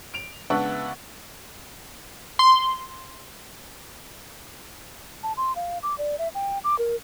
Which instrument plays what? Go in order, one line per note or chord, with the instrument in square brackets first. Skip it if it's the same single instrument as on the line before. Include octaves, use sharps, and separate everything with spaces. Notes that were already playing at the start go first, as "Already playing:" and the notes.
[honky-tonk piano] D7 F7
C#2 B3 D4 E5 F#5 C#6
[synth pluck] C6
[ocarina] A5
C6
F5
D6
D5
E5
G5
D6
A#4